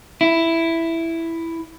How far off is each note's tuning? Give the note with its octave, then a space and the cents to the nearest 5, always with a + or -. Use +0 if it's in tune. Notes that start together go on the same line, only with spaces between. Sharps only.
E4 +5